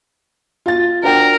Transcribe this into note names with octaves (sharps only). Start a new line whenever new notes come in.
F4 A6
D4 F#4 A#4 G5